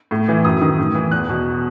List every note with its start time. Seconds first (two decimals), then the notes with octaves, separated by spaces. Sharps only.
0.11 A2
0.28 E3
0.45 F#2 D#6
0.61 D#3
0.79 A2
0.95 E3
1.11 E2 F#6
1.29 B2